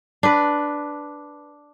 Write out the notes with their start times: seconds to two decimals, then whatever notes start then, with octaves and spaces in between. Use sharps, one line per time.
0.23 D4 B4